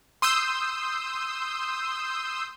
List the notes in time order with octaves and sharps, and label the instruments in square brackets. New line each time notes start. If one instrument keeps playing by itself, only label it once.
[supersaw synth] C6 D#6 E6 G6